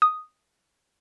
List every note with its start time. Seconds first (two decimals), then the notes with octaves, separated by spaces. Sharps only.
0.02 D#6